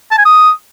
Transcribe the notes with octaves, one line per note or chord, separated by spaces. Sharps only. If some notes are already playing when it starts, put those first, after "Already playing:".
A5
G#5
D#6